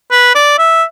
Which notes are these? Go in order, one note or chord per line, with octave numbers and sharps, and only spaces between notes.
B4
D5
E5